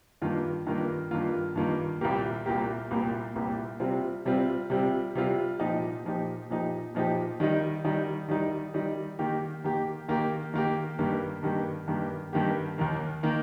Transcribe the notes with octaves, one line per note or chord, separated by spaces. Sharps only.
G2 D#3 A#3 F4
G2 D#3 A#3 F4
G2 D#3 A#3 F4
G2 D#3 A#3 F4
C2 A#2 A#3 G4
C2 A#2 A#3 G4
C2 A#2 A#3 G4
C2 A#2 A#3 G4
C3 G3 C4 F4
C3 G3 C4 F4
C3 G3 C4 F4
C3 G3 C4 F4
A#2 F3 D#4 G4
A#2 F3 D#4 G4
A#2 F3 D#4 G4
A#2 F3 D#4 G4
D#3 G3 D#4
D#3 G3 D#4
D#3 G3 D#4
D#3 G3 D#4
D#3 A#3 G4
D#3 A#3 G4
D#3 A#3 G4
D#3 A#3 G4
G2 D#3 A#3 G4
G2 D#3 A#3 G4
G2 D#3 A#3 G4
G2 D#3 A#3 G4
D#2 D#3 A#3
D#3 A#3